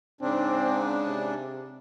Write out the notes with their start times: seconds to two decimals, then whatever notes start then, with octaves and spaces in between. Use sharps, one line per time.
0.21 G#2 C#3 C4 D4
1.07 C3